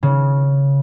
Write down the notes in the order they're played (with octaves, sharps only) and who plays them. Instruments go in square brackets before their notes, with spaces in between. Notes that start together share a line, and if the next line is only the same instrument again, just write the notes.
[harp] C#3